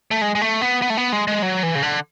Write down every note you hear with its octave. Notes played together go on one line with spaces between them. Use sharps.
A3
G#3
G#3
A3
B3
B3
A3
B3
G#3
G#3
F#3
E3
C#3
D3